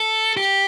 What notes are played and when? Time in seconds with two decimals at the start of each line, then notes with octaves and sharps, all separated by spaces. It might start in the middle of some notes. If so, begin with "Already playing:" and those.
Already playing: A4
0.37 G4